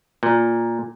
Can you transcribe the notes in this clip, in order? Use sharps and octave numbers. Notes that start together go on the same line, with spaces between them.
A#2